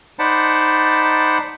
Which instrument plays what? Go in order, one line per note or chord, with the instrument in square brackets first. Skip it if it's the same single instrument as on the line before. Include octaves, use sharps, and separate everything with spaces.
[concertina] D#4 C5 D5 F#5 A5 B5